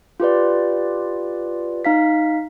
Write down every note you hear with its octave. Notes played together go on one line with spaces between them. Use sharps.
F4 G4 B4 D5
D#4 F5 B6